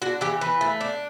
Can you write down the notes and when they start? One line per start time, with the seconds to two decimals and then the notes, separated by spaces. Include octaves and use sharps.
0.02 D4 F#4
0.21 E3 G4
0.41 E3 B4
0.61 A3
0.81 D4